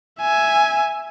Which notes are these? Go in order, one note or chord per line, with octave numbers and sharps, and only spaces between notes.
E5 G#5